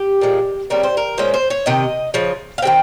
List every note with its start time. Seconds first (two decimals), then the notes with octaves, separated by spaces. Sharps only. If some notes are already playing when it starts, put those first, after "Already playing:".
Already playing: G4
0.21 A#2 F3 G#3
0.70 C#3 G3 C4 A#4
0.83 C5
0.97 A#4
1.18 A#2 G#3 C#4 C5
1.34 C5
1.50 C#5
1.66 C3 D#3 D#5
2.14 C#3 F3
2.58 F5
2.62 D#3 G#3 C4 G5